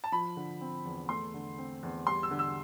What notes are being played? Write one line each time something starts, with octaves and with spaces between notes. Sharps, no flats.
A5
F3 B5
D3
C4
E2
A3 C6
D3
C4
E2
G3 C6
E6
D3
E6